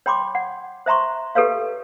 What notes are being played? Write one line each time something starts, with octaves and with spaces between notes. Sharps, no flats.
C#5 G5 B5 C6 D6
F#5
C5 E5 A#5 C6 C#6
G4 A4 B4 C#5 F5